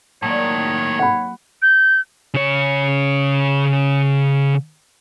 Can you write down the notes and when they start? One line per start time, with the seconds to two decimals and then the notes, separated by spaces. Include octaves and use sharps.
0.22 A2 D#3 F#3 A#3 C#5 D5
0.99 F#5 B5
1.62 G6
2.34 C#3 C#5